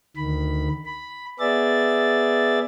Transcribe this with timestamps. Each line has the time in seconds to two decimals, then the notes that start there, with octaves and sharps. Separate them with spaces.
0.17 D2 D#3 B5
0.86 B5
1.40 B3 G#4 D5 E5 A6